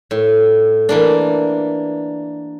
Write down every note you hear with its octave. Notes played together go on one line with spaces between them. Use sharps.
A2
E3 A#3 D4